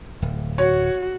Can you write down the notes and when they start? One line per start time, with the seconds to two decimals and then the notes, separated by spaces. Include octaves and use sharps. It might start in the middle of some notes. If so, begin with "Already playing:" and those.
0.22 D1
0.58 F#4 C#5